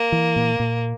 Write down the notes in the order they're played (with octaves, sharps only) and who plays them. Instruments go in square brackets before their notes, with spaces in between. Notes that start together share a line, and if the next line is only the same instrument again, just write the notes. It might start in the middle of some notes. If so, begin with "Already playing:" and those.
Already playing: [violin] A#3
[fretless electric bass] E3
A#2
A#2